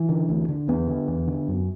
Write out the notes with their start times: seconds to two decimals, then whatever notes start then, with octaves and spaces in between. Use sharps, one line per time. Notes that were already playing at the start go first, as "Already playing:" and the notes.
Already playing: E3
0.09 D3
0.29 D2
0.48 D3
0.68 E2 B3
0.87 D3
1.08 E2
1.27 D3
1.48 F#2